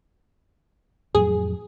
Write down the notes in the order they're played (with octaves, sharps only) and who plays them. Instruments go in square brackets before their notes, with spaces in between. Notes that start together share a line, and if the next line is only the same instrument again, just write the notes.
[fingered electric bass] F2 A2 F#3 [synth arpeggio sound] G#4